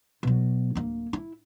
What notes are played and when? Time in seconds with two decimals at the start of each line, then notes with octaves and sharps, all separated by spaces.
0.23 B2 F#3
0.75 D1 A#3
1.13 E4